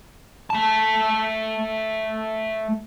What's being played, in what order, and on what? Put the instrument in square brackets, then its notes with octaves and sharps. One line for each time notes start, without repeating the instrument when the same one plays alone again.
[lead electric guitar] A3 A5